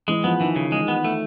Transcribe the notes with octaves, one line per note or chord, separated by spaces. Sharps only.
E3 G#3
F3 B3
D#3 E3
C#3
G#3
B3
A3